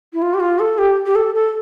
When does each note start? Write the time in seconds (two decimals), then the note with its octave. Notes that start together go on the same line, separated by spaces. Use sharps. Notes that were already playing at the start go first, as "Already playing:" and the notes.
0.14 E4
0.22 F4
0.34 G4
0.40 F4
0.59 A4
0.78 G4
1.06 G4
1.15 A4
1.35 A4